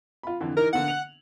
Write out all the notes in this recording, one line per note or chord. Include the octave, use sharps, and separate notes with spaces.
F4 B5
F2 D3 E3
E3 D#4 A#4
D3 A#3 B3 F#5
F7 F#7